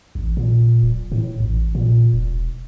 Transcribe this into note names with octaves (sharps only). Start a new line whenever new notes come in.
A1
A#2
D1
A2
A1
A#2
E1